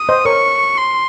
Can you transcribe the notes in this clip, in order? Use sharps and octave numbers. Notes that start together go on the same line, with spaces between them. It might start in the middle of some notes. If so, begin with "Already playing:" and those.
Already playing: D#6
C5 D#5
A#4 C#5 C#6
C6